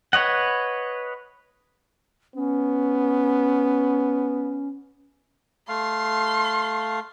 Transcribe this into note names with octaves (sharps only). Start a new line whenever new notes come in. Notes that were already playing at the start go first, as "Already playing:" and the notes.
B4 C#5 D#5 F#5
B3 C#4
A3 F5 C6